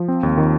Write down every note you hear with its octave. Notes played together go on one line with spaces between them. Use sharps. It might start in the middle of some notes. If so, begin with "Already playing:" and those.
Already playing: F3
C4
D#2
D#3